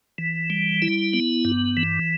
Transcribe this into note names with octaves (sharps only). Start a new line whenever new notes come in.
E3
G3
E4
B3
G2
E3